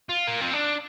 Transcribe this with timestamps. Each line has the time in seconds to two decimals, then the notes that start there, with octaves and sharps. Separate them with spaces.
0.09 F4
0.27 A#3
0.41 C4
0.53 D4